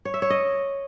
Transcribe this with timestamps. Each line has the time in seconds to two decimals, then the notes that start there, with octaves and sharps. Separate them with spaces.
0.05 C#5
0.14 E5
0.22 C#5
0.30 D#5